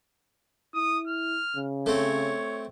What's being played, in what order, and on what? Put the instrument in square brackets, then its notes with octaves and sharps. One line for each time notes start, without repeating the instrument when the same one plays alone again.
[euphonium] E4 [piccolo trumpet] D#6
[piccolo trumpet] F6
[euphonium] C#3
[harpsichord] A3 C4 [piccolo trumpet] C#5